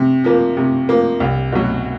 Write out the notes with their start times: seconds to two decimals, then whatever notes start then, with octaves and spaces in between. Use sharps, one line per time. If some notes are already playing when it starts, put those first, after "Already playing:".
Already playing: C3
0.24 F3 A#3
0.57 C3
0.89 F3 A#3
1.20 C2
1.52 B2 F#3